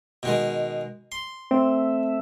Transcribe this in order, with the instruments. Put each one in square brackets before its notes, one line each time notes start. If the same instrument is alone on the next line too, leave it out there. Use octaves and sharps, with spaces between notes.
[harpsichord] B2 D#3 G#3
C6
[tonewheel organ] A3 E5 [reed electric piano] C4